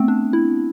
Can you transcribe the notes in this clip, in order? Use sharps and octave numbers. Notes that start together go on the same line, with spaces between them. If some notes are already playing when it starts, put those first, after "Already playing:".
Already playing: A3 B3 C4
D4
E4